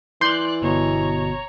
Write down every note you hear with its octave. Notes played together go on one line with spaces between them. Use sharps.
E3 D5 C6 F#6 G6
G1 B2 C#5 A#5